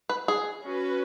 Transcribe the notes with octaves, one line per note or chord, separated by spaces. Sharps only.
B4
G#4
C#4 F#4 B4